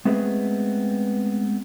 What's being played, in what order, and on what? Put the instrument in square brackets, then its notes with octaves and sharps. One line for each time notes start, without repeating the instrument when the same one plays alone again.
[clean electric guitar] G#3 A3 B3 C4 G#4 B4